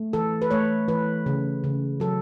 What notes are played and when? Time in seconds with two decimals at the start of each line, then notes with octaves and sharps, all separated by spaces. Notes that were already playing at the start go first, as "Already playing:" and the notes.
Already playing: A3
0.13 E3 A4
0.42 B4
0.51 A3 C#5
0.88 E3 B4
1.26 C#3
1.64 C#3
2.00 F#3 A4